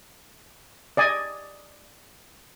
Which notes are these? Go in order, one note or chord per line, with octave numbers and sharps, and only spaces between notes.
D5 D#5 G#5